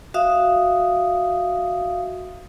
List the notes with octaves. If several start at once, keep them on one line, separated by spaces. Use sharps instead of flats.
F#4 E5 F5 D#6